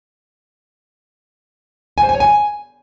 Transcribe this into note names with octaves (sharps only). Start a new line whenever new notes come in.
G#5
C5
G#5
C#5
G#5